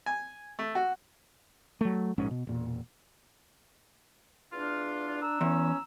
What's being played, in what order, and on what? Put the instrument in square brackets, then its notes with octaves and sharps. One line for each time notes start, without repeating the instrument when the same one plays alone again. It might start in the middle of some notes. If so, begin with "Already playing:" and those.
[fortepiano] G#5
A3
F#4
[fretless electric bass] F#3 A3
A#1 G#2 C#4
B2
E1 A#2
[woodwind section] E2 F4 [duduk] D4
[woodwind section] A#5 E6
[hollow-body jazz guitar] E2 [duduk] C#4